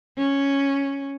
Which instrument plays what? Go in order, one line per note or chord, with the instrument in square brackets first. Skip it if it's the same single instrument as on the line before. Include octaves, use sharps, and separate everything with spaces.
[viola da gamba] C#4